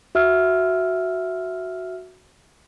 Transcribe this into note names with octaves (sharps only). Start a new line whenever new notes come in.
F#4 E5 E6 F6